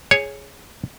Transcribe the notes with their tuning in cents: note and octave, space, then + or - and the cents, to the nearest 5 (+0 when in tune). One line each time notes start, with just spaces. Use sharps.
G#4 +0 C#5 +0